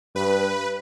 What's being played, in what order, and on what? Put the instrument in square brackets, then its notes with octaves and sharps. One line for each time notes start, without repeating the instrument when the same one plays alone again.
[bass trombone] G2 [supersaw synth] B4